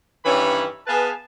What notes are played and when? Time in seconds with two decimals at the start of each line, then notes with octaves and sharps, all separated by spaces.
0.25 G2 D#3 E3 C#4 C#5 B5
0.87 B3 G#4 B4 F5 G#5 A5